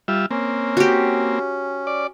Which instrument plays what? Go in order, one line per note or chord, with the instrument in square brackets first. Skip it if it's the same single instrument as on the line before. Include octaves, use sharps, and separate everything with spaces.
[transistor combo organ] G3 F4 E5
[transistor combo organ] A#3 C4 [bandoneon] C#4
[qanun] F#4 G4
[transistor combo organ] D5